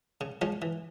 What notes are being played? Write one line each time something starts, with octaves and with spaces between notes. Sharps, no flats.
C#3
F3 G#3 C#4
E3